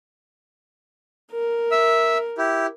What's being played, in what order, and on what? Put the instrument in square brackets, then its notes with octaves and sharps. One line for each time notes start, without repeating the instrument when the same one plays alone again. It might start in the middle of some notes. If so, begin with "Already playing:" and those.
[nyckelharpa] A#4
[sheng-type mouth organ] E5 E6
E4 G4